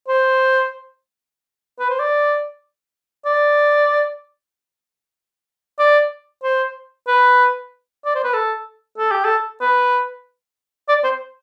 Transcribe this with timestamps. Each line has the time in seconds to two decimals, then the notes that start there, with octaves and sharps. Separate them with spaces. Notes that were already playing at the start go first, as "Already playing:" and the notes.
0.08 C5
1.79 B4
1.89 C5
1.99 D5
3.25 D5
5.79 D5
6.43 C5
7.07 B4
8.05 D5
8.15 C5
8.24 B4
8.33 A4
8.98 A4
9.11 G4
9.25 A4
9.61 B4
10.88 D5
11.04 C5